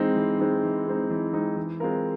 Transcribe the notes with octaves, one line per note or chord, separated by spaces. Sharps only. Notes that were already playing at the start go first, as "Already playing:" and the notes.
Already playing: E3 G#3 C4 D#4
E3
G#3 C4 D#4
E3
G#3 C4 D#4
E3
G#3 C4 D#4
E3
G#3 C4 F4 A#4